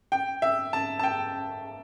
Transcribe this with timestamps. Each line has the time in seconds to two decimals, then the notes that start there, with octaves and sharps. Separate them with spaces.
0.12 G5
0.42 E5
0.73 A5
0.99 A5
1.04 G5